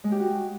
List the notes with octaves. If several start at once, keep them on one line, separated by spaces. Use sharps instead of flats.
G#3
G4
F#4